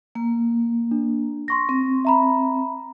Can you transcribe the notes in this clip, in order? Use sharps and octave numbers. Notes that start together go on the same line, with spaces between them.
A#3
D4
C6 C#6 A#6
C4
E5 A#5 B5